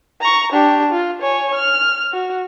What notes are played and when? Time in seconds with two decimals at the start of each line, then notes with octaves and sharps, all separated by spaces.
0.21 A#5 C#6
0.53 D4 G4
0.92 F4
1.22 C#5 G#5
1.55 F6
2.13 F#4